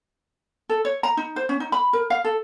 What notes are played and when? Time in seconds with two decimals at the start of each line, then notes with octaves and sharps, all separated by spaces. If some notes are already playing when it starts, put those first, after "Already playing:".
0.69 A4
0.85 C#5
1.03 A#5
1.17 D#4
1.36 C5
1.49 C#4
1.60 D#4
1.72 B5
1.93 A#4
2.10 F5
2.25 A4